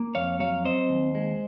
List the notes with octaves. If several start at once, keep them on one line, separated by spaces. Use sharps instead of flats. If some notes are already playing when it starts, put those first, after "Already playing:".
Already playing: A#3
F2 C#5 F5
F#3 C#5 F5
C4 C5 D#5
D#2
G#3